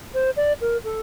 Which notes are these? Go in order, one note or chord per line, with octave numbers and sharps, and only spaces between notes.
C5
D5
A#4
A4